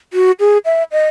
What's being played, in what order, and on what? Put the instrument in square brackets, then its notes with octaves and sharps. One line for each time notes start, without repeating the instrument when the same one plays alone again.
[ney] F#4
G#4
E5
D#5